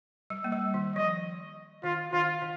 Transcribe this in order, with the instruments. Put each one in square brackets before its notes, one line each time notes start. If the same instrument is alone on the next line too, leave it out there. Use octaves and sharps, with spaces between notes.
[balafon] G3
A#3
G3
D#3
[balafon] F3 [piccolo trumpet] D#5
[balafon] D#3 [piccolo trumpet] F4
[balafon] D#3 [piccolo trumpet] F4
[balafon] D#3